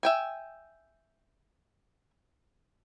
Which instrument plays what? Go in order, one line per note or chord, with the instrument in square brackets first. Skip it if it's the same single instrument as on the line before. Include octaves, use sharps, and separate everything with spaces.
[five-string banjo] E5 G5 G#5